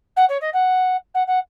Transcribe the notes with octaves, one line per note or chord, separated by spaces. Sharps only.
F#5
C#5
D#5
F#5
F#5
F#5